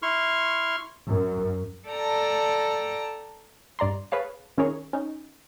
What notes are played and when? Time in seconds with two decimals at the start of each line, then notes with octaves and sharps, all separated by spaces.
0.02 E4 C6 C#6 F6
1.08 F#2
1.90 A4 D5 G5 A5 A#5
3.79 G2 D5 A#5 C6
4.12 G#4 B4 C#5 F5 A5
4.58 D#3 C#4 E4 G#4 A#4 C#5
4.93 C#4 D#4